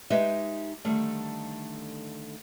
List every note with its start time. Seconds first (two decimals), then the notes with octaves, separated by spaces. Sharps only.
0.10 G#3 D#4 G4 B4 D#5 E5
0.85 D3 D#3 G3 A3